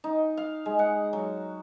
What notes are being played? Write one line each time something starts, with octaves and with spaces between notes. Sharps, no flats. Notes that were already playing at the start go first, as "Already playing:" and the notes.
D#4
F5
G#3
F#5
F#3